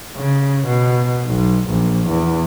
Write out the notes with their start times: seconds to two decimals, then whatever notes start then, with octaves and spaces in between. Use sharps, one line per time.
0.17 C#3
0.66 B2
1.26 B1
1.68 A#1
2.08 E2